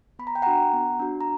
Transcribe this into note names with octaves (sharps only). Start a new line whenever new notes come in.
B3 B5
A#5
G5
D4 F#4 F#5 A#5
B3
D4 F#4
A#5